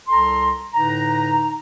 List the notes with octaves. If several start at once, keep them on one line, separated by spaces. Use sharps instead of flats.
C2 A4 A#5 C6
A2 D3 D#4 B4 A#5